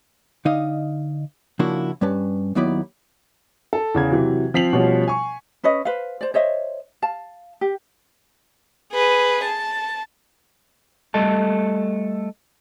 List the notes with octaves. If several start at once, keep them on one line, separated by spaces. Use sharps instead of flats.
D3 D#4 D#5 F5
C#3 F3 A#3 D4 E4 F#4
G2 G3 C#4 B4 A5
D#2 D#3 F#3 B3 E4 D5
A4
E2 C#3 G#6
C3 E3 F#3
F3 C4 B6 C7 F7 F#7
B2 F3 G3 C#4
G#5 C#6
C#4 B4 C#5 D#5
B4 C5 F5
C5 D5
C5 C#5 D#5 E5
F5 A5
G4
G#4 B4
A5
G3 A3 A4 D#5 A5